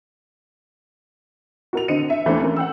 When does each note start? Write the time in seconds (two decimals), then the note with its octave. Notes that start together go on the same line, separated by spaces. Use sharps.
1.73 F#4 A#4 F7
1.88 D3 C4 D#5 C#7 D#7
2.10 E5
2.26 D#2 E3 A3 C4 D4
2.41 C#4 A#4
2.56 F#5 G5 E6